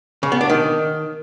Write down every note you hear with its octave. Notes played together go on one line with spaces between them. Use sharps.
C#3
B3
D4
D#3